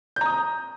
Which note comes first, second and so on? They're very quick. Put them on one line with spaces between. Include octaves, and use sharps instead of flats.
G6 A#5 D#6